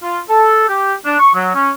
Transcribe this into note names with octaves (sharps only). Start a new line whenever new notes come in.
F4
A4
G4
D4
C#6
F#3
C#4